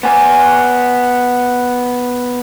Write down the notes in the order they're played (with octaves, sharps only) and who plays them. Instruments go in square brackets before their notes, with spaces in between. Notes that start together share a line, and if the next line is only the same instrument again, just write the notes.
[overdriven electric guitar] B3 G#5